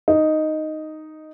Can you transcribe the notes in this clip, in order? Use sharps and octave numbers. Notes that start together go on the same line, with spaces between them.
D#4